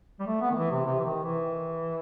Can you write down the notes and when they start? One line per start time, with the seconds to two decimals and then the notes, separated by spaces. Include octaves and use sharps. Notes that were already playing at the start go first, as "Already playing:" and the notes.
0.20 G3
0.27 A3
0.41 B3
0.51 D#3
0.56 E3
0.71 C3
0.85 C3
1.00 E3
1.04 D#3
1.24 E3